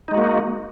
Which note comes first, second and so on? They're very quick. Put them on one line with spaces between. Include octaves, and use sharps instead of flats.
D#4 G#3 F#4 A#3